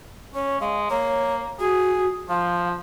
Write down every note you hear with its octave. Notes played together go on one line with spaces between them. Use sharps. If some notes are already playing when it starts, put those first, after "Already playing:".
C#4 C#5
G#3 F5
A#3 C#5
F#4 G#4
F3 F5